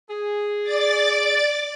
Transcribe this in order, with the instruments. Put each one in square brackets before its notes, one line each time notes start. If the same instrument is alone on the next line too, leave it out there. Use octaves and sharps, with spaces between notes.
[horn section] G#4
[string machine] D5 D6 A6